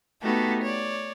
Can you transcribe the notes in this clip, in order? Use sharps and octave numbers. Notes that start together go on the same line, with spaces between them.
A3 B3 D#4 F#4 G4 A4
C#5 D5